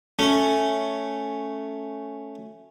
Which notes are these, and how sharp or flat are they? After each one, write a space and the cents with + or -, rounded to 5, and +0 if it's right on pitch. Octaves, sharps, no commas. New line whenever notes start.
A3 +0 C#4 +0